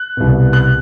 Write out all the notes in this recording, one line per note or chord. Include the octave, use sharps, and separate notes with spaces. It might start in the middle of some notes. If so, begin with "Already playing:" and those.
Already playing: F#6
C2 B2
F#6